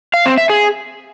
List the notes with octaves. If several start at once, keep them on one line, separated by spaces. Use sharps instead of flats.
F5
C4
E5
G#4